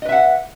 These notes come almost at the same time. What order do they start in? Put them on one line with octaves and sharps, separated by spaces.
D#5 B4 E5 F#5